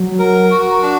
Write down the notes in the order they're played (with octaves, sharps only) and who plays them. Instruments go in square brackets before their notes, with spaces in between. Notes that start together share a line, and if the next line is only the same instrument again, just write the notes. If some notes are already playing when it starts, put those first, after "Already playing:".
Already playing: [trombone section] F#3
[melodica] A#4
F#4
D4